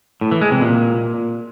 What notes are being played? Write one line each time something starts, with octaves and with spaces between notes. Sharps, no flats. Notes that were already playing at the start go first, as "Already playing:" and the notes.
A2
E3
G#3
C3
A#2